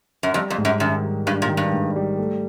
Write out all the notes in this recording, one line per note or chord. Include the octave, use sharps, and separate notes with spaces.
F#2
F2 G3
F2
G#2
F#2
F#2 D#3
G3
G2 G3
A#2
D#3
G2
G#2
G3
A3